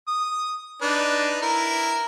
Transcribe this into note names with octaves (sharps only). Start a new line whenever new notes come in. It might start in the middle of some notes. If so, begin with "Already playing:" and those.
D#6
D4 D#4 B4
E4 A#4